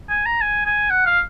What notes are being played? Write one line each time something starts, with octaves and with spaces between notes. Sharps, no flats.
G#5
A#5
G#5
G#5
F#5
F5